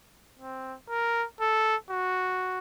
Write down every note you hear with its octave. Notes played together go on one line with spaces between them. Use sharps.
C4
A#4
A4
F#4